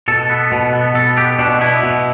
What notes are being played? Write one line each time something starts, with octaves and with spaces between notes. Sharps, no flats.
B2 A4
B3
B2
B3
B2 A4
B3 G4
B2 D4
B3 E4
B2